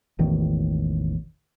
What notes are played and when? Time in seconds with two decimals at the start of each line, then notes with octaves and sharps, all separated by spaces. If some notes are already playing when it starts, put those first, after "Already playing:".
0.19 E1 A1 D#3